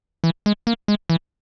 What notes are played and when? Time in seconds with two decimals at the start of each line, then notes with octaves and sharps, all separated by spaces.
0.24 E3
0.46 G#3
0.67 A#3
0.88 G#3
1.10 E3